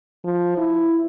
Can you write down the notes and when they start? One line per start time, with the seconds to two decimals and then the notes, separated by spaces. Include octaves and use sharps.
0.25 F3
0.57 E4